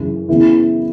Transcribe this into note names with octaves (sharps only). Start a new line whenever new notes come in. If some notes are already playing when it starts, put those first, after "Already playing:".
Already playing: F#2 C#3 E3 C#4
C#3 E3 B3 E4